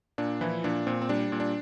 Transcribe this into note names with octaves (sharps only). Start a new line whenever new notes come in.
A#2 D4
E3 F3 E4
A#2 D4
A#2 C4
C4
G3 D4
A#2
D4